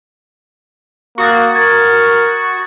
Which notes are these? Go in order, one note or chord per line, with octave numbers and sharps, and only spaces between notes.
A#3 F#4 C#6 D#6 A6
A#4 G#6 A6